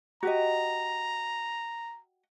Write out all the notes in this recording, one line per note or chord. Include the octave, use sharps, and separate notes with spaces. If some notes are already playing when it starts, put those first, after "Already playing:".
F#4 G4 D#5 A#5